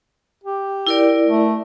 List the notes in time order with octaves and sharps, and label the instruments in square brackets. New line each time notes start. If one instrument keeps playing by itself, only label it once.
[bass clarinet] G4
[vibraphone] E4 A#4 D5
[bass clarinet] A3